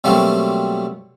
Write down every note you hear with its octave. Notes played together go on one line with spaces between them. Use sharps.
B2 F#3 G3 A3 A#3 C4